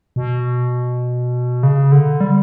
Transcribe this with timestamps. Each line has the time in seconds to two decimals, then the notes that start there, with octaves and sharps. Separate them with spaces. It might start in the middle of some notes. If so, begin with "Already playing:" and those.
0.16 B2
1.63 C#3
1.92 D3
2.21 G3